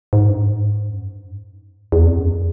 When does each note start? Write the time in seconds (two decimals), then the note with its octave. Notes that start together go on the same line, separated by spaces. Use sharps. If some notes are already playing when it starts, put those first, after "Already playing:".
0.13 G#2
0.29 G2
0.38 G#2
0.90 F#2
1.07 G2
1.92 E2
2.06 F2
2.18 F#2